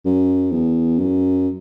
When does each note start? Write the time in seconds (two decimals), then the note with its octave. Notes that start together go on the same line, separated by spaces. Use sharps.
0.05 F#2
0.52 E2
0.99 F#2